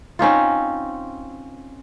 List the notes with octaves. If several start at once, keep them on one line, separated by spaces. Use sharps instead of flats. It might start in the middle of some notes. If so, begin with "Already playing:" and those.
C4 C#4 D#4 F4